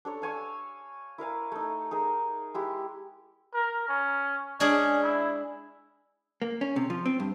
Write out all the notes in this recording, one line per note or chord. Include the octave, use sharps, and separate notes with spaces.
D4 A4 C#5
F5 G#5 C#6 E6
E4 A#4 F5 G#5
A3 D#4
D#4 G#4 A#4
G#3 E4 G4
A#4
C#4
G#3 C#4 D4 G#4
E4
A#3
C#4
C3
F3
C4
G2